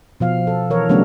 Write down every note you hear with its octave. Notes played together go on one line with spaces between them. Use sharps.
B2 F3 F5
A4
E3 A#4 C#5
C#3 F#3 G3 A3 B3 D4